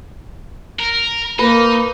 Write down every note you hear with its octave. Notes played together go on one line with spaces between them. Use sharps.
A#4
A#3 D#4 B4